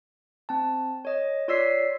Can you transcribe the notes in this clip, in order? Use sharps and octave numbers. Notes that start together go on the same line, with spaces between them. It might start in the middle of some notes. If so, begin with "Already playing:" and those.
C4 A5
C#5 D#5
F4 C#5 D5 E6 B6 C7